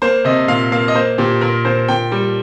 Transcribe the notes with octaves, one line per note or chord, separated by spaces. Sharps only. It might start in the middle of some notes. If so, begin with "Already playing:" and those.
A#3 C5
C3 D#5
A#2 F5
A#3 F5
D#5
A#3 C5
A#2 G4
A#2 A#4
A#2 C5
A#2 G5
G3